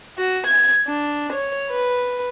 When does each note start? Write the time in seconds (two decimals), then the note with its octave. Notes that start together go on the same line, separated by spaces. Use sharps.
0.17 F#4
0.47 G#6
0.86 D4
1.33 C#5
1.70 B4